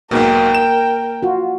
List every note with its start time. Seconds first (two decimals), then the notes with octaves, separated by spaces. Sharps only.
0.11 B1 G#2 B2 A#3 A#4 G5
0.55 E7
1.23 F4 F#4